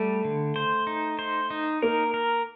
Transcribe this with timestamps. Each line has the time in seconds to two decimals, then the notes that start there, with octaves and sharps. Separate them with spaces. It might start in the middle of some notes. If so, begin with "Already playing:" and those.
Already playing: G3 A3
0.25 D3
0.56 C5
0.87 D#4
1.19 C5
1.50 D#4
1.82 A#3 A#4
2.14 A#4